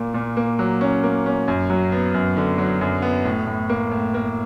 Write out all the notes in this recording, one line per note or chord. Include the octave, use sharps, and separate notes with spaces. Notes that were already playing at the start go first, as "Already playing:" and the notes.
Already playing: A#2 A#3
A#2
A#3
F#3
C#4
A#3
C#4
F#2
F#3
B3
F#2
D3
F#3
F#2
B3
A2
A2
A#3
A2
A#3